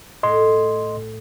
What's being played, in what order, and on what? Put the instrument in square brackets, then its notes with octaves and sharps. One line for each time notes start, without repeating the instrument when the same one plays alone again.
[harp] A2 [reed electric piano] D#5 C6